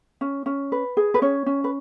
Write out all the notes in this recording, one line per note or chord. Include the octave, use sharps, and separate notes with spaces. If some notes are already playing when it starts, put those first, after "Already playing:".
C#4
C#4
B4
G#4
B4
C#4 C#5
C#4
B4